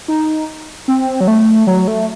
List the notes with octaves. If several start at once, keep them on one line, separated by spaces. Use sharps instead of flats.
D#4
C4
F#3
A3
F#3
A3